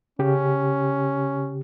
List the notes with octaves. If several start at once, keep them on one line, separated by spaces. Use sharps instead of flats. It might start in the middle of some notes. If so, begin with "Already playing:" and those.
C#3 C#4 G4